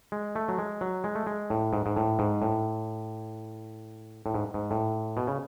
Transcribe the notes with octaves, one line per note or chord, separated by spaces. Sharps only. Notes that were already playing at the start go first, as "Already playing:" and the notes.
G#3
A3
F#3
G#3
F#3
G#3
A3
G#3
A2
G#2
G#2
A2
G#2
A2
A2
G#2
G#2
A2
B2
C#3